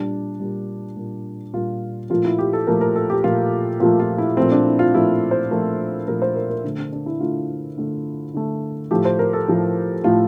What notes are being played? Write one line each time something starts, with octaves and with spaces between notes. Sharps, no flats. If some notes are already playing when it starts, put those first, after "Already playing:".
Already playing: A#2 G3 D4
A#2 G3
A#2 G3
A#2 G3 F4
A#2 F3 A3 F4
E4
G4
A4
A#2 F3 A3 A#4
A#4
A4
G4
A#2 F3 A3 F4
A#2 F3 A3 F4
F4
E4
A#2 F3 A3 C4
D4
E4
F4
A#2 F3 A3 E4
C5
A#2 F3 A3 A#4
A#2 F3 A3 A#4
C5
A#4
A#4
D3 A3
D4
D4
E4
D3 A3 F4
D3 A3
D3 A3
A2 F3 A3 G4
C5
A#4
A4
A2 F3 A3
A2 F3 A3 F4